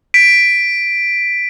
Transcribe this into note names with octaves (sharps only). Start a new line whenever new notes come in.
B6 D7